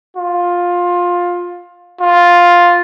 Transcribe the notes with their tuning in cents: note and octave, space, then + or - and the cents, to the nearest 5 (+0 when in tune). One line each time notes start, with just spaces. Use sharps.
F4 +15
F4 +5